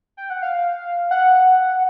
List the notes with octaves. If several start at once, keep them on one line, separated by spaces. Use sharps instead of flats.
G5
F#5
F5
F#5